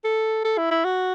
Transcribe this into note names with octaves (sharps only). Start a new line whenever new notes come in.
A4
A4
E4
E4
F#4